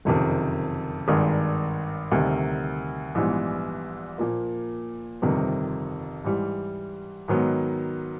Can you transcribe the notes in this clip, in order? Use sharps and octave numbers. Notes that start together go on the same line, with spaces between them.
F#1 F2 C3 D#3
G#1 G2 D#3 G#3
D2 C3 D#3 G3
A#1 G#2 E3 G3 B3
A#2 F3 A#3
G1 F2 C3 D#3 G3
G#2 E3 G3
G#2 D#3 F#3 B3